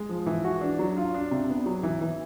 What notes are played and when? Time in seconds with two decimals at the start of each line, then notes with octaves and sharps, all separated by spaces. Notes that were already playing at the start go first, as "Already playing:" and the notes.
Already playing: G#3
0.09 F3
0.26 E3
0.44 F#4
0.61 D4
0.79 F#3
0.97 F4
1.15 D4
1.31 C3
1.50 B3
1.66 F#3
1.83 E3
2.01 E3